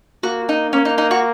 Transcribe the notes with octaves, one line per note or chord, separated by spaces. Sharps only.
A#3 F#4
D#4
A#3 C#4
D#4
D#4
F#4